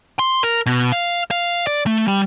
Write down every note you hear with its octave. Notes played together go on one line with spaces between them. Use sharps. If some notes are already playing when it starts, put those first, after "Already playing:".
C6
A#4
B2
F5
F5
D5
A3
G3